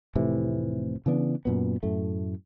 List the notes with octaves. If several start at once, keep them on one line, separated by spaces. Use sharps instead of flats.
F1 A2 C3 E3
C#3 E3 B3 D4
F#2 A#2 B3
F#2 A2 A3